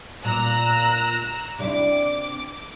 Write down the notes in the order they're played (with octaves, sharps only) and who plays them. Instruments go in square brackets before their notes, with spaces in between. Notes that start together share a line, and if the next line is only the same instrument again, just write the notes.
[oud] A#2 [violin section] A#5 E6 F#6
[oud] C3 D4 E4 [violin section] D6